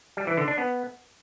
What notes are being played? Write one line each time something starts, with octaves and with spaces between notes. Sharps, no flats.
G3
E3
D3
D4
B3